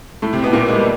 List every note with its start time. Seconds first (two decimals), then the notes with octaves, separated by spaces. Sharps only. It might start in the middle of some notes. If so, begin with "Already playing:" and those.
0.22 A2 A3
0.33 C3 C4
0.43 B2 B3
0.53 A#2 A#3
0.68 G#3
0.76 G3